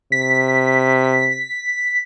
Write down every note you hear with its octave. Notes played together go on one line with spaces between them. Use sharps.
C3 B6